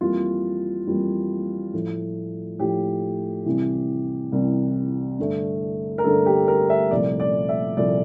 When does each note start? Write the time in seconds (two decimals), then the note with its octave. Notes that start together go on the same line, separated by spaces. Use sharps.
0.01 F2 E3 G3 A#3 F4
0.87 F2 E3 G3 A#3
1.73 A2 F3 A3
2.59 A2 F3 A3 G4
3.46 C2 C3 E3
4.32 C2 C3 E3
5.19 G2 D3 A3
5.98 A#4
6.04 G2 D3 A3 A4
6.26 G4
6.48 A#4
6.70 E5
6.91 C2 A#2 F3 A3 D5
7.20 D5
7.49 E5
7.77 C2 A#2 F3 A3 D5